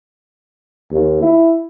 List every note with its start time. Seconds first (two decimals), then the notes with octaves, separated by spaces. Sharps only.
0.91 D#2
1.22 E4